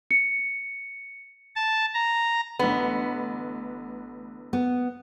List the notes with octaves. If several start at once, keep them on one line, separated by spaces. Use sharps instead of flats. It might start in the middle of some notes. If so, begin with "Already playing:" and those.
C#7
A5
A#5
A1 D3 B3 B4
B3